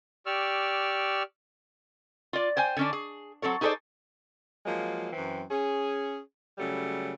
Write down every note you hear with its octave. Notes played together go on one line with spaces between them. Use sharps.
G4 D5 C#6 E6 F6
F4 D5
C5 G5 G#5
D3 C#4 D4
G#4
F#3 C4 A4 C#5
D#4 G#4 A4 B4 C5 D5
F3 F#3 G#3 A#3
F#2 E3 C4
C#4 G#4
C#3 F#3 G3 A3